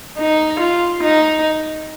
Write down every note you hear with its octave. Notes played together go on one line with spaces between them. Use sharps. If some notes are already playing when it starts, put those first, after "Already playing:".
D#4
F4
D#4